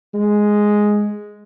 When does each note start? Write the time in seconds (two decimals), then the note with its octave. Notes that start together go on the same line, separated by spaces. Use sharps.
0.14 G#3